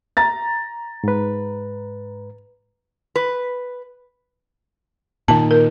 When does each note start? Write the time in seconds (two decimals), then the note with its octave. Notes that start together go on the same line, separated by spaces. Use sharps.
0.17 A#5 A6
1.04 G#2 B4
3.16 B4
5.28 A#2 D#3 A5
5.51 A#4